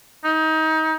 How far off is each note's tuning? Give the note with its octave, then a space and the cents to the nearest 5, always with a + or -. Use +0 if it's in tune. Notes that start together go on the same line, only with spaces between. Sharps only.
D#4 +25